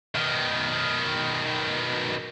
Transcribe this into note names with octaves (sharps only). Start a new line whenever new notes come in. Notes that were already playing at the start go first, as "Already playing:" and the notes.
B2 D#3